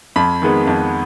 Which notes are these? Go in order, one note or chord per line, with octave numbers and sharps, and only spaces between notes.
F2 B5
D#3 G#3 B3
F2